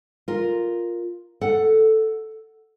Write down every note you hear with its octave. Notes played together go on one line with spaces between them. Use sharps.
F4 A#4
A4 F#5